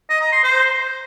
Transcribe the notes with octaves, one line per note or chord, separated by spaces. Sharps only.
D#5
A#5
C6
C5